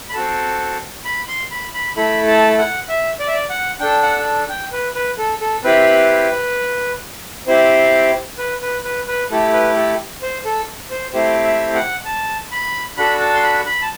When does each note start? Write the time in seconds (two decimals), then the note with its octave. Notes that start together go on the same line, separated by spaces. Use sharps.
0.09 B5
0.13 C4 F#4 A4 A5
1.05 B5
1.28 C6
1.51 B5
1.74 B5
1.96 A3 E4 A4 B5
2.28 A5
2.58 F#5
2.89 E5
3.20 D5
3.27 E5
3.34 D5
3.50 F#5
3.80 D4 A4 G5
4.03 F#5
4.49 G5
4.72 B4
4.95 B4
5.18 A4
5.41 A4
5.63 C4 E4 G4 B4
7.47 C4 E4 G4 C5
8.38 B4
8.62 B4
8.84 B4
9.08 B4
9.30 A3 E4 G4 A4
9.53 B4
9.76 A4
10.22 C5
10.45 A4
10.91 C5
11.14 A3 C4 E4 G4 C5
11.44 E5
11.75 F#5
12.05 A5
12.51 B5
12.97 D4 F#4 A4 B5
13.20 A5
13.34 C6
13.43 B5
13.66 B5
13.82 A5